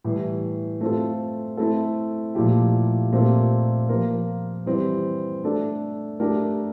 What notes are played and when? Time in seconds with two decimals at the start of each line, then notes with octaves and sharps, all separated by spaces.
0.04 A2 E3 G3
0.81 A3 C4 F4 A4
1.57 A3 C4 E4 A4
2.35 A#2 F3 A3 E4 G4
3.12 A#2 A3 C4 G4 A#4
3.89 F3 A#3 F4 A#4
4.66 E3 G3 C4
5.44 A3 D4 A4
6.20 A3 D4 G4 A#4